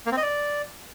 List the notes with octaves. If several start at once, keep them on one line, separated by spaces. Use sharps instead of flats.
A#3
C4
D#5
D5